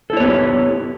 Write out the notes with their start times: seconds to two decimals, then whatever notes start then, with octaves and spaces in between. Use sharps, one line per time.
0.10 A4
0.13 E4
0.17 C#5
0.20 B3
0.24 G4